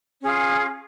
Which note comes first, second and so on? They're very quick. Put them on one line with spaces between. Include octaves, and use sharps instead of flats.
C#4 G#4 F4